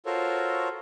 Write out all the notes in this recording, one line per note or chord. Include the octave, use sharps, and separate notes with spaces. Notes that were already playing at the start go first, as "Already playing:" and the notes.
F4 F#4 A4 A#4 C5 C#5